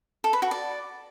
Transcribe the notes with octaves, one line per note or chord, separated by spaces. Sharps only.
A4
B4
F#4
D5